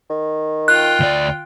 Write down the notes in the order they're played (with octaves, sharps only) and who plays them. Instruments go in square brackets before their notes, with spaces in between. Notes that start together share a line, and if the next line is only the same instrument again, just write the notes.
[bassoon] D#3
[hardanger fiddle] F4 G5 [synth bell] F#6
[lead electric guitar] D2 D5